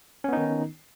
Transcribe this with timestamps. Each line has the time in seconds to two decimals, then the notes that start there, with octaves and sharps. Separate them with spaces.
0.24 C#4
0.29 B3
0.33 D#4
0.37 D#3